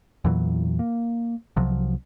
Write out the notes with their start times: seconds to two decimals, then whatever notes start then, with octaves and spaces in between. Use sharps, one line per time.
0.24 E2 A#2 E3 F#3
0.79 A#3
1.57 C2 C3 F3 F#3